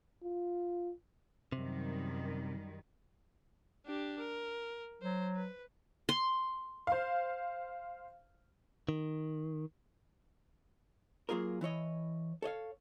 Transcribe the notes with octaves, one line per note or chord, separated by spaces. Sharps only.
F4
F#2 C3 D#3 G3
D4 G4
A#4
F#3 C5
B4
C6
C5 F5
D#3
F#3 A#3 F4 G#4 A#4
E3 E4 C#5 D#5
A4 C#5 D#5 F5